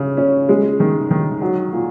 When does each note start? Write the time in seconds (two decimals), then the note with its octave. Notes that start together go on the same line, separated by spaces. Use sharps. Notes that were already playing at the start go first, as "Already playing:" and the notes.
Already playing: C#3
0.17 C#4
0.49 G#3
0.80 D#3
1.11 D#3
1.41 F#3
1.73 A#2